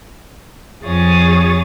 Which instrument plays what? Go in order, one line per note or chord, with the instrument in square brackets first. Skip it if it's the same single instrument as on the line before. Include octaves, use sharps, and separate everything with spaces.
[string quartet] F2 F3 G#4 C#5 D#6 A6